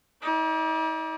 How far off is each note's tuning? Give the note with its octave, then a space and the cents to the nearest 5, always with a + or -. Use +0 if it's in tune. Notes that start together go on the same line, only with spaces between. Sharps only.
D#4 +45 D5 +0